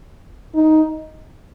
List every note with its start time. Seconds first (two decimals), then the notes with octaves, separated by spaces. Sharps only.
0.55 D#4